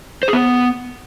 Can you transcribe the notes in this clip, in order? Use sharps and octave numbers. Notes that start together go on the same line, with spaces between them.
C5
G#4
B3